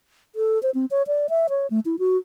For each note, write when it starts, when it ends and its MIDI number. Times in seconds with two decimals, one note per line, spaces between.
0.36 0.61 69
0.63 0.70 72
0.75 0.86 60
0.91 1.03 73
1.07 1.27 74
1.29 1.47 76
1.49 1.67 73
1.70 1.80 57
1.85 1.96 64
1.99 2.17 66